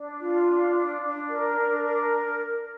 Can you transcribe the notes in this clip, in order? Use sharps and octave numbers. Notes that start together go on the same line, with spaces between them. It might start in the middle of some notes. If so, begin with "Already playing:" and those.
Already playing: D4
F4
D4
D4
D4
A#4
D4
A#4